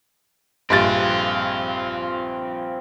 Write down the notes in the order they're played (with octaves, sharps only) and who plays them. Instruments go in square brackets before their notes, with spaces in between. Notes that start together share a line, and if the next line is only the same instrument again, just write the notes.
[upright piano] A#1 G2 A6 [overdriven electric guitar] C4 F4